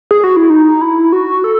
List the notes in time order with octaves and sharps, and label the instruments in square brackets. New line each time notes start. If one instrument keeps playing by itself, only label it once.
[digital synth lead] G#4
F#4
E4
D#4
E4
F#4
A4